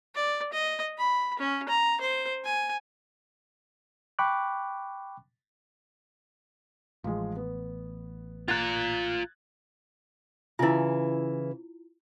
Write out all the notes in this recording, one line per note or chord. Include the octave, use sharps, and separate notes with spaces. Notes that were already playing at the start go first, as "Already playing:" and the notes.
D5
D#5
B5
C#4
A#5
C5
G#5
G5 B5 C#6 D6 F#6
A1 F3 G#3
B3
F4 A#5 F#6 G#6 A6
C#3 E3 E4 F4